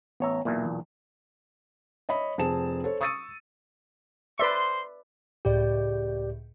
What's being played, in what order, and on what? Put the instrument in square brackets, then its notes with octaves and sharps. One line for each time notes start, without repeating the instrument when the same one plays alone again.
[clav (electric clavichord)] A1 E5 [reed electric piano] B3 C#5 A#5
[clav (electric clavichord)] B1 E2 A#2 [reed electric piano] A#3 E5
[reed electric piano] E3
[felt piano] C#5 D#5 E5 B5
F1 C4 G#4 A5 E7
A4 C5 C#5
C#6 D#6 E6 A6 C#7 D#7
[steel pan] B4 D5 E5 [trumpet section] C5 C6
[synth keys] C#2 A2 G6 [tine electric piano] G4 D5